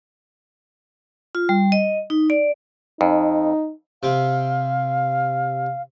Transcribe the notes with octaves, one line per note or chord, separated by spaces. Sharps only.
F4
G3
D#5
D#4
D5
F2 D#4
C3 C4 F5